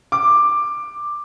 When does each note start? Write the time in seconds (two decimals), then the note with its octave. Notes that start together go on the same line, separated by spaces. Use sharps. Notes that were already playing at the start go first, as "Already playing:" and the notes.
0.12 D6